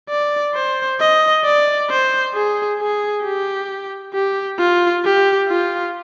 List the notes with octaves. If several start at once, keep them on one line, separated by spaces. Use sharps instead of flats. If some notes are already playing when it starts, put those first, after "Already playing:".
D5
C5
D#5
D5
C5
G#4
G#4
G4
G4
F4
G4
F4